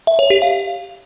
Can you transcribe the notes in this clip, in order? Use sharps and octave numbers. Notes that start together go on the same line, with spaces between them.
E5
C#5
G4
F5